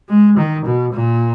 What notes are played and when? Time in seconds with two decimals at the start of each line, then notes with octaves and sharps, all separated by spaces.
0.09 G#3
0.37 D#3
0.65 B2
0.93 A#2